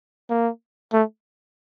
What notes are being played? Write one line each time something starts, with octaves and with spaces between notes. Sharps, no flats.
A#3
A3